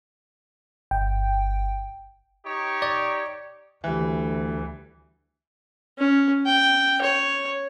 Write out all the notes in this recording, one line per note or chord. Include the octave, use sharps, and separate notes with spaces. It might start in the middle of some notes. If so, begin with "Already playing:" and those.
G1 G5
D#4 G4 C#5
D5
D2 E3 G3
C#4
G5
C#5